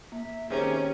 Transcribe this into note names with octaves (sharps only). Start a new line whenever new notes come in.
A#3 E5
D#3 C4 C#4 G4 G#4 A#5